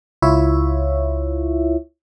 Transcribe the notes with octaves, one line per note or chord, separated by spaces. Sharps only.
C#2 E4 F4 C#5 E5